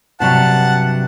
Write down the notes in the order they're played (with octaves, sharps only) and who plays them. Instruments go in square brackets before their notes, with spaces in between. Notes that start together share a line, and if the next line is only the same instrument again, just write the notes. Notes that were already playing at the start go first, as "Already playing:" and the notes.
[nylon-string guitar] G2 C3 F#3 [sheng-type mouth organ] F#5 A5